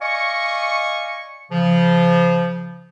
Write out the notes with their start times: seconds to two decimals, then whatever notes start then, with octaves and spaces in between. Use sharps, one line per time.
0.02 D5 D#5 F5 G#5 C#6
1.51 C#3 F3